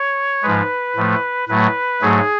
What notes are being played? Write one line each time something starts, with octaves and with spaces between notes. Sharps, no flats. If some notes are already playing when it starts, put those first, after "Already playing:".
Already playing: C#5
G#2 F3 G#3 B4
A2 F3 A3
A2 F#3 A3 B4
G#2 F#3 A3 G#4